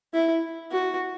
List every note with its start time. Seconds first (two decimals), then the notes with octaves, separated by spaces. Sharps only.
0.14 E4
0.71 F#4